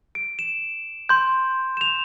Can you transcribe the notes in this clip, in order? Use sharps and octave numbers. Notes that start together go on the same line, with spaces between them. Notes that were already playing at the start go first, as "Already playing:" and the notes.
D7
E7
C6 G6
E7
F7